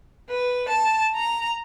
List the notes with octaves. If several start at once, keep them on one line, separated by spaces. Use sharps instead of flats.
B4
A5
A#5